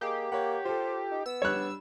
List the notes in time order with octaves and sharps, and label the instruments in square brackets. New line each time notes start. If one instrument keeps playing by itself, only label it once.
[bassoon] A#3 [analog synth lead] G4 [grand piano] G#4 D#5
[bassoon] A#3 [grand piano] C#5 F#5
[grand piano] F4 A4 [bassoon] C5
[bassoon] D#4
[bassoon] B3 [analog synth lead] E6
[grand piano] G3 D4 [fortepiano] C#5 F#6